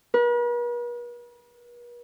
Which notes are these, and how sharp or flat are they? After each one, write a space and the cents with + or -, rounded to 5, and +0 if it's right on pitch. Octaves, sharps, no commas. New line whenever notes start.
B4 -45